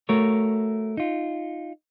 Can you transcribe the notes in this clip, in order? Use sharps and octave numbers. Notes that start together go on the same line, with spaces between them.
A3 F#4 A#4 C#5
D#4 F4